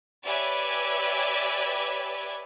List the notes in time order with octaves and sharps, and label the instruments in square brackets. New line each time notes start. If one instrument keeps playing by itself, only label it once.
[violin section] G4 B4 C#5 D5 E5 G#5